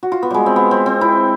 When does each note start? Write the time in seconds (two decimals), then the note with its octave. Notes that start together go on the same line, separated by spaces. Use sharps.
0.03 F#4
0.12 F4
0.23 B3
0.31 G3 G#3
0.46 C4
0.56 B3
0.71 C4
0.86 C4
1.01 E4